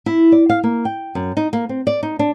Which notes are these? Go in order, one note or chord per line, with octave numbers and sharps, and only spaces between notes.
E4
D5
F5
A#3
G5
F#2
D#4
A#3
C4
D5
D#4
D4